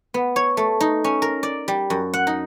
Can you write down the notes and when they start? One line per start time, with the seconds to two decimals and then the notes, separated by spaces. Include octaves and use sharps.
0.14 B3
0.36 C#5
0.57 A3
0.81 D#4
1.04 C#4
1.22 A#4
1.43 D5
1.68 G3
1.90 F#2
2.14 F#5
2.27 D#4